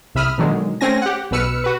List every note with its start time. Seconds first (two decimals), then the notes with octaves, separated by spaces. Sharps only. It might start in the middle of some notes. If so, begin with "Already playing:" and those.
0.15 C2 C3 E5 B5 D#6 F6
0.38 B2 D3 D#3 F#3 G#3
0.81 A3 C4 C#4 G#5 A#6
1.02 G4 F#5
1.31 B1 B2 B4 E6 F6 C#7
1.64 F#4 B4